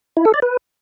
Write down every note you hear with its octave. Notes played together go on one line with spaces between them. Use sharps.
E4
A4
D5
B4